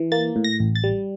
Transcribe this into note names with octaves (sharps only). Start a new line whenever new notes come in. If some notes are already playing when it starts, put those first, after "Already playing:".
Already playing: E3
A#3 A6
A2
A#6
A1
A6
G3